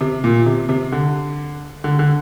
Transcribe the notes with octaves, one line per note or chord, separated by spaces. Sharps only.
C3
A#2
C3
C3
D3
D3
D3